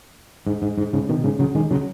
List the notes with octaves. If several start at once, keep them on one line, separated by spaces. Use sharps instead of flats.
G#2
G#2
G#2
G#2 C#3
B2 D#3
G#2 C#3
C#3 F#3
D#3 G#3
C#3 F#3